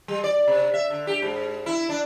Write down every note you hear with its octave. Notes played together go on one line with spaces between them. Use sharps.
G3
D5
C3
E5
D3
G4
G#2
E4
D4